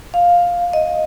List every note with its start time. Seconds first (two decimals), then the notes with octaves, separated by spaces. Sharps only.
0.14 F5
0.73 D#5